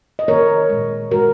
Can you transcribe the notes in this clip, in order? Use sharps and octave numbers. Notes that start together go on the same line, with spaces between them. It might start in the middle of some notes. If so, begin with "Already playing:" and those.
D#5
D#3 A#3 A#4 C#5
A#2 G#3
D#3 G#3 F#4 A#4